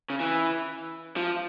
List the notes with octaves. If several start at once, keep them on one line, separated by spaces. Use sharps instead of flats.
C#3
E3
F3